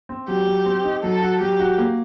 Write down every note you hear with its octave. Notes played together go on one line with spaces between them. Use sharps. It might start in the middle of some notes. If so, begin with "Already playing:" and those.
C4
F#3 G4
F#3
C4
D#4
F#3 A4
F#4
F#3 G4
F#4
A#3